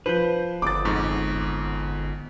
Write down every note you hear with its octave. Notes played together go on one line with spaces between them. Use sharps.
F3 B4 C5 G6
G1 D6 D#6 A6
F2 G#2 C#6